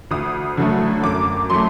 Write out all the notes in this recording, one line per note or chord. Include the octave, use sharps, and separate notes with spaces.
D2 D#6
D3 F#3 A3
F#2 D6
F#3 A3 C6